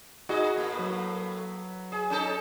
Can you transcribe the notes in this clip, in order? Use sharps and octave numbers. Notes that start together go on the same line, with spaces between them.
D#4 F#4 G#4 D#5
A2 A#3
F#3 B4
G#4
C#4 D#4 A4